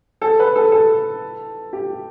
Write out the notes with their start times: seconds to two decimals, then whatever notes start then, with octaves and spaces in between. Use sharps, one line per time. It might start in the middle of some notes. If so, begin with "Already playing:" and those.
0.22 A4
0.39 B4
0.55 A4
0.72 A4
1.73 G4